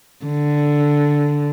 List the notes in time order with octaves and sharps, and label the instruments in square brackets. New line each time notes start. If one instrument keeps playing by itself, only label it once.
[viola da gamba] D3